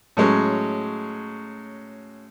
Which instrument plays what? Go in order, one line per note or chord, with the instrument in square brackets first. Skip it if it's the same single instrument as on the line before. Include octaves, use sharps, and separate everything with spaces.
[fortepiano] A2 F#3 G#3 C#4